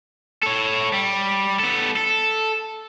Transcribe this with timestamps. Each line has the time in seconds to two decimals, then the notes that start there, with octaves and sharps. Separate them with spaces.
0.43 A4 C#5
0.93 G3
1.60 B3 A4
1.97 A4